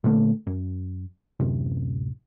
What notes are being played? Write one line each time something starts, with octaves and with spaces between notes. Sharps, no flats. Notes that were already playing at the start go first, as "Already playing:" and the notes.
A#2 D3 A3
F#2
D1 F#2 C3